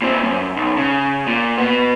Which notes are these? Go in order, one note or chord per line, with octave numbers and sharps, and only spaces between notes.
A#2 C4
F#2
B1
C#3
A#2
B2 B3